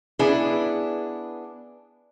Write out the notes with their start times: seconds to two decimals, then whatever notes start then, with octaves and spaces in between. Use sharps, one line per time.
0.19 B3 D4 E4 G#4